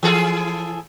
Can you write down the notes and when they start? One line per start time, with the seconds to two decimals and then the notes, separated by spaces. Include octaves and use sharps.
0.03 E3 G#4 A4